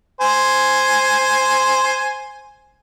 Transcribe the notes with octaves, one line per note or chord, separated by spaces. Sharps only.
C5 G#5